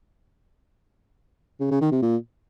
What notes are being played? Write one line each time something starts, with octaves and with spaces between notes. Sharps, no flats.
C#3
C#3
D#3
C3
A#2